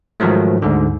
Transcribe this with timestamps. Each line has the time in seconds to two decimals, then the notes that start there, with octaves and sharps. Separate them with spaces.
0.20 G#2 D#3 F3 F#3 A3
0.62 D2 G#2 D3